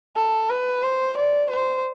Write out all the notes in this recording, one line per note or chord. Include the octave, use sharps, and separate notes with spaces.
A4
B4
C5
D5
C5